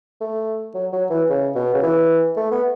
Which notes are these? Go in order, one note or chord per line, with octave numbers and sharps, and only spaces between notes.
A3
F#3
F#3
E3
C#3
B2
C#3
E3
A3
B3